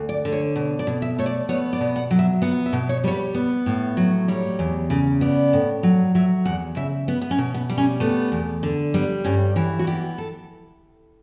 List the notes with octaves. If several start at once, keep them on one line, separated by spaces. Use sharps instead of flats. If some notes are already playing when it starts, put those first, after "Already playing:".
Already playing: D2
D5
D3
C#5
B2
D5
B2
E5
A3 C#5
D5
B3 C#5
D5
B2
F#5
F#3
E5
B3 F#5
E5
B2
C#5
G3 C#5
B4
B3
A2
F#3
G3 C#5
E2
C#3
B3 D5
A2
F#3
F#3 E5
E2 F#5
C#3 E5
B3 B4
B3
C#4
B2
B3
G3
C#4
A3 B3
E2
D3
G3 B3
G2 C#4
E3 G4
F#4
B3 G4
A4